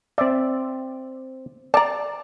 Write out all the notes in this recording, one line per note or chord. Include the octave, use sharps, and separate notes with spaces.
C4 D5 E5
D5 A5 A#5